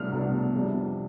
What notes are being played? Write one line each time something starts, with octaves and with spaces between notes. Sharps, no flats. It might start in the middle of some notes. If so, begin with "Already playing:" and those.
Already playing: C2 B2 A3 D4 F6
C2 B2 A3 D4
F2 C3 G3 D4